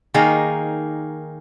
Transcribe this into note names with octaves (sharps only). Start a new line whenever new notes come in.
D#3 A#3 D#4 G#4